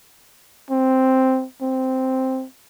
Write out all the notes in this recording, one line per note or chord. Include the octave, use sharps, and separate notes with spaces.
C4
C4